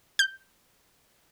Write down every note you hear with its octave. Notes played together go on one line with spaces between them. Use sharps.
G6